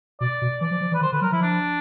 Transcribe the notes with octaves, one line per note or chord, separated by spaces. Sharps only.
B2 D5
B2
E3 D5
F3
F3
E3
B4
D#3 C5
D3 B4
F#3 A#4
F3 E4
D4